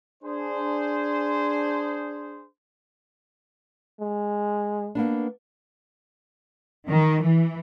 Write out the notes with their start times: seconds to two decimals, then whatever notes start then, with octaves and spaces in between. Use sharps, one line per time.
0.23 D4 G#4 C5
4.01 G#3
4.95 A#3 B3 D4
6.88 D#3
7.23 E3